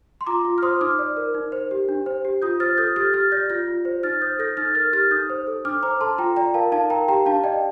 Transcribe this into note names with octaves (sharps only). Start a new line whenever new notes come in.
C6
F4 A#5 D6
F4
F6
C5 C6 D#6
D#4 D6 F6
D5
A#4
D#4
C5
G4
D4
C5
G4
F4 D#6 G6
C5 F6 A6
A4 D#6 G6
G4 F6 A6
G4 F6 A6
D5 G6 A#6
F4 G6 A#6
F4
C5
D#4 F6 A6
C5 D#6 G6
A4 G6 A#6
D#4 F6 A6
A#4 F6 A6
G4 F6 A6
D#4 D#6 G6
C5
A4
D4 D6 F6
C5 A#5 D6
A4 A5 C6
F4 G5 A#5
D5 G5 A#5
A#4 F5 A5
D#4 F5 A5
A#4 G5 A#5
G4 G5 A#5
D4 F5 A5
D5 D#5 G5